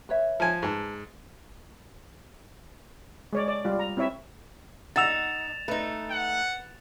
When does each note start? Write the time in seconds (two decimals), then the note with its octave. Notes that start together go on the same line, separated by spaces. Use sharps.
0.09 B4 C#5 E5
0.40 F3 G#5
0.63 G#2 B4 A5
3.33 G#3 C#5 D5
3.48 D5
3.65 G3 F4
3.79 A#5
3.97 C4 E4 C#5 E5
4.96 D#4 F#5 E6 A6 E7 F7
5.68 A3 D#4 B4
6.11 F#5